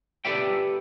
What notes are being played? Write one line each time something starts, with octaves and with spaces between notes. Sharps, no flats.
G4 A4 B4 D5 E5 G5